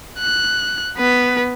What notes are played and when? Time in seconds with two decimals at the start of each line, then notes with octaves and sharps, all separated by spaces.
0.19 F#6
0.97 B3 B4